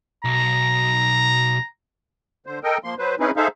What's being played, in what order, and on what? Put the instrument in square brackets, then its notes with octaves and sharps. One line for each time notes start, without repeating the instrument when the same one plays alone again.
[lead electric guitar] B1 [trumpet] A#5
[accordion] D3 C5
A4 A#4 D#5 G5
F3 A#3 C6
F#3 B4 C5
C4 C#4 D#4 E4 G#4 B4
D#4 G#4 A4 C5 E5 F5